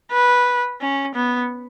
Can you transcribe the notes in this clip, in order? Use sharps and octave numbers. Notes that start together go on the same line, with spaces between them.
B4
C#4
B3